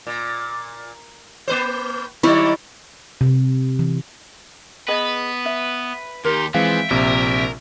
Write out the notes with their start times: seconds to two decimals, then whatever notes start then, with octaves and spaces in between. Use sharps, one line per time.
0.07 A#2
1.48 A#3 B4 C5
2.23 D#3 E3 F#3 E4 C#5
3.21 C3
3.79 E3
4.88 B3 G#4 B4 D#5
5.46 E5
6.25 D#2 D#4 G4 A#4 C6
6.54 E3 F3 G#3 C4 E5 F5 G5
6.91 A#1 C3 A#4